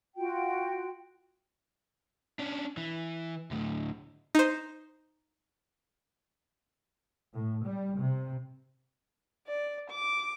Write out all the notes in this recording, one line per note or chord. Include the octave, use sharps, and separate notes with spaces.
F4 F#4 G5
C#4 D4
E3
D2 A2
D#4 C5
A2
G3
C3
D5
D6